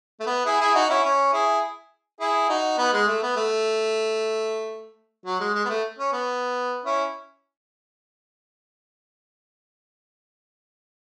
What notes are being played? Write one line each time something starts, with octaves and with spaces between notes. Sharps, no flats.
A3
B3
E4 G#4
E4 G#4
D#4 F#4
C#4 E4
C#4
E4 G#4
E4 G#4
D#4 F#4
B3 D#4
G#3
A3
B3
A3
F#3
G#3
G#3
B3
A3
C#4
B3
C#4 E4